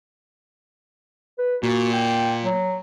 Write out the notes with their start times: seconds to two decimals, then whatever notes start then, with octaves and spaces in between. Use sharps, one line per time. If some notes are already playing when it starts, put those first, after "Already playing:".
1.38 B4
1.63 A#2 F#4
1.93 G5
2.43 F#3